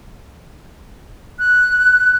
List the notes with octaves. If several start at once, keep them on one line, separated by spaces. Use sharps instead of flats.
F#6